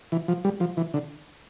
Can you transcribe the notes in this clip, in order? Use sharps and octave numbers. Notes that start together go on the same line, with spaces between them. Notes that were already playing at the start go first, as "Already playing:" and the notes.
E3
F3
G3
F3
E3
D3